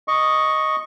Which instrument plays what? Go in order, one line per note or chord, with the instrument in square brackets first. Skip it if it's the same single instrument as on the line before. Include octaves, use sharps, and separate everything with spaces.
[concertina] D#5 C#6